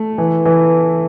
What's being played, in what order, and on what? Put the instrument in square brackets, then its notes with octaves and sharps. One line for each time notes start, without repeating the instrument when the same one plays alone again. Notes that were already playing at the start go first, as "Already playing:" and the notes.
Already playing: [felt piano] A3
[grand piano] E3
E3